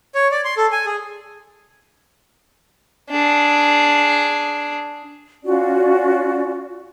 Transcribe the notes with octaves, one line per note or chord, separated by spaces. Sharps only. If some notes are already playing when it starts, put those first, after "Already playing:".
C#5
D5
C6
A4
G#5
G#4
D4 G#4
C#4 F4 F#4 D5